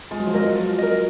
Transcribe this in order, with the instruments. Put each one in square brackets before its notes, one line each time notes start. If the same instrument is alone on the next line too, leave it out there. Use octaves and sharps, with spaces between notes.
[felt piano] G#3 [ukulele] F4
[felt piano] F#3
F3
[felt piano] F#3 [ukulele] A#4 D#5
[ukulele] F4
A#4 D#5